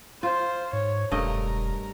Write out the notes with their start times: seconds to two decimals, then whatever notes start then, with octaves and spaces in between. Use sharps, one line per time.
0.23 F4 C5
0.73 G#2 C#5
1.12 E1 G2 A3 A#4 D#5